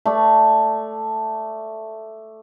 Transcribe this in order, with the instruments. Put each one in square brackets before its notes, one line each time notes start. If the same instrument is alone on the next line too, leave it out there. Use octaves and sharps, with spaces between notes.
[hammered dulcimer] A3 D5